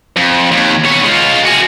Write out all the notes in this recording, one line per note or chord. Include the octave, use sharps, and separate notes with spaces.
F2
D#2
B3 C#5
G#3 F4
F#4 G#4